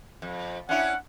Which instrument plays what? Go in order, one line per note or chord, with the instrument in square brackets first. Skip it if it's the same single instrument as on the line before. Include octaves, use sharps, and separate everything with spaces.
[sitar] F2
[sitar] C#4 D4 E4 [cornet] F#5